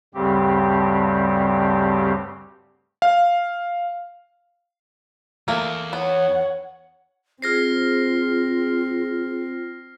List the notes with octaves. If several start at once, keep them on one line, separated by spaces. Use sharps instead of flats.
D2 G2 C#3 G3 C4 G4
F5
E2 A3 A#3
B3 C#5 F#5
C4 F4 G#4 C5 F6 A#6 C7